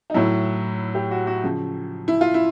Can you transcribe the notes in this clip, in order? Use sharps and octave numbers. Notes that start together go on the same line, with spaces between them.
D#4
A2 F#3 E4
G4
F#4
F#4
C#3 F3
E4
F4
E4